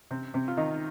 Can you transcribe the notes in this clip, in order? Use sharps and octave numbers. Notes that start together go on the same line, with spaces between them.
C3 C4
C3 C4
F4
D#3 D#4